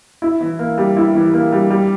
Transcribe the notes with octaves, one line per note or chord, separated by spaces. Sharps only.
E4
E3
A#3
G3
E4
E3
A#3
G3
G3